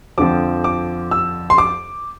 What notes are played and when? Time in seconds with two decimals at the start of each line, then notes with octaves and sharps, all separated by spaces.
0.18 F2 D3 F3 C4 D6
0.64 D6
1.11 E6
1.50 C6
1.58 D6